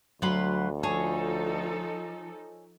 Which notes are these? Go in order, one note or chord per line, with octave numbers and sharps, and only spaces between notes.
D2 F#3 F4 F#5 B5
F3 D#4 G#4 A4 C#5 A5